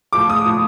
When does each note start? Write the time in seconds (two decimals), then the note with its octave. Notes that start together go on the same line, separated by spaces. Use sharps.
0.13 A2 F3 D6
0.30 D#6
0.45 A2 F3